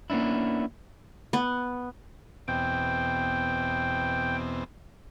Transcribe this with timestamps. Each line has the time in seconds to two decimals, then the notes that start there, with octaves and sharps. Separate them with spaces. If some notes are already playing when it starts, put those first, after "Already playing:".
0.10 A#3 B3 C#4 D4 E4
1.33 B3
2.48 E2 B2 C4 G5